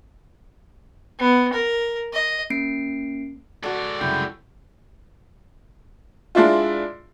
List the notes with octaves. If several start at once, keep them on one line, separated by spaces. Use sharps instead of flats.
B3
A#4
D#5
A#3 C#4 C7 D7
G#3 F#4 A4 D5
C2 F#2 C#3 E4 G5
G#3 D4 E4 F4